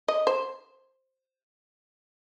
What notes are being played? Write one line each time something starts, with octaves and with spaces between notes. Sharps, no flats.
D#5
C5